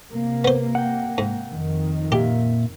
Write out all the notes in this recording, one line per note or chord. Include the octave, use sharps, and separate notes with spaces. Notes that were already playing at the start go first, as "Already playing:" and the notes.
C3 A#3
B3 C5
F#5 G5
G#2
F2 D#3
A#2 A#3 G4 E5